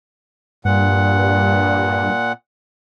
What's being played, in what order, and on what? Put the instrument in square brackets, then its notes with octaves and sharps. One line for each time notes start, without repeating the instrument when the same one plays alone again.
[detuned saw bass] G2 [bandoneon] A#2 F#5